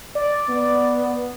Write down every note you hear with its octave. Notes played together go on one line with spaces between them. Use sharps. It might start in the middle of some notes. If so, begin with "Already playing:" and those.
D5
B3